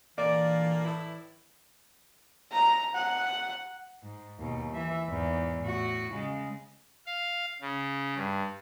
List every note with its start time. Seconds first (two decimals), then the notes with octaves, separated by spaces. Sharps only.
0.18 A#2 D3 E3 A#3 D5
0.85 A2 E4
2.52 A#5
2.95 F#5
4.02 G#2
4.39 D#2 B2
4.73 E3 E5
5.08 E2 G#2
5.62 A2 F#4
6.13 C#3 G#3
7.06 F5
7.61 C#3
8.16 G2